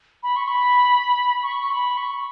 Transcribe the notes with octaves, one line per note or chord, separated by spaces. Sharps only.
B5
C#6
B5
C#6
B5
C#6